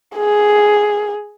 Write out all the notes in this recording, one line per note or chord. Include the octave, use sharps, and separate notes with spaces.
G#4